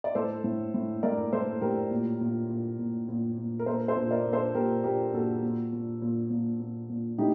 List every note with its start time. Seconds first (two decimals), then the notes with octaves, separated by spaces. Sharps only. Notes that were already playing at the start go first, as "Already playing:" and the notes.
0.04 D5
0.15 A2 A4 C5
0.44 A2
0.74 A2
1.03 A2 A#4 D5
1.32 A2 A4 C5
1.61 A2 G4 A#4
1.91 A#2
2.21 A#2
2.49 A#2
2.79 A#2
3.09 A#2
3.38 A#2
3.59 A#4
3.66 A#2 A4 C5
3.88 A4 C5
3.97 A#2
4.11 A#4 D5
4.26 A#2
4.33 A4 C5
4.54 A#2 G4 A#4
4.84 A#2 G4 A#4
5.13 A#2 F#4 A4
5.42 A#2
5.73 A#2
6.02 A#2
6.30 A#2
6.60 A#2
6.90 A#2
7.18 A2 D#4 G4